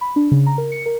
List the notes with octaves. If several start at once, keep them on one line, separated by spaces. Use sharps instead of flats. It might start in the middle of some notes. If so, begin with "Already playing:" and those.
B5
D4
C#3
A#5
A#4
C#7
A#4